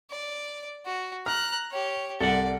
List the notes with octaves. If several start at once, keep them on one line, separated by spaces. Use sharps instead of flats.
D5
F#4
A#5 F6 F#6
G4 C#5
C2 A4 D5 F#5